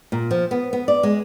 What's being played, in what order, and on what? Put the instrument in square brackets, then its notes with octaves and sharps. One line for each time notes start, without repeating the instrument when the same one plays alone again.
[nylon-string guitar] A#2
F3
B3
B3
D5
G#3